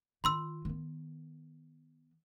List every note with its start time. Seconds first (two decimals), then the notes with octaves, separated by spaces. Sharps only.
0.24 D#3 F4 B5 C6 E6
0.65 D#3 B3